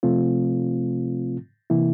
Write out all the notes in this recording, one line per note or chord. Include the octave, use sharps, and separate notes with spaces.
C3 F3 A3 C4 F4
C3 E3 A#3 E4